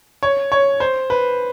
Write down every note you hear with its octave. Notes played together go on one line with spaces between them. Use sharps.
C#5
C#5
C5
B4